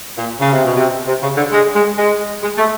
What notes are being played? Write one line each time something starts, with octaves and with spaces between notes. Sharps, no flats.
A#2
C#3
C3
B2
C3
C3
C#3
D3
G#3
G#3
G#3
G#3
A3